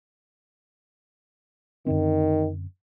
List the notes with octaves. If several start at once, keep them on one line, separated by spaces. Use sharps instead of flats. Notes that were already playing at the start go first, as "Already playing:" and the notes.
F#2 D3 D#3 C4